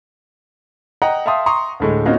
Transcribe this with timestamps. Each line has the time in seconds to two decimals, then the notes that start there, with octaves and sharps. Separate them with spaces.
1.02 D#5 F#5 G5 A#5
1.26 E5 F5 G5 A5 C6 D#6
1.46 A#5 C6 C#6 D#6
1.80 D2 A2 G#3
2.06 A#3 C4 C#4 D#4 F4 F#4